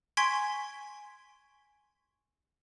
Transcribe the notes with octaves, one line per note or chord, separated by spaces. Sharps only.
G#5 C6 C#6 G#6 B6 D7